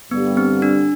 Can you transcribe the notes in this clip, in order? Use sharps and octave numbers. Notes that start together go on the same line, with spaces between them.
G2 D3 G3 B3
C4
D4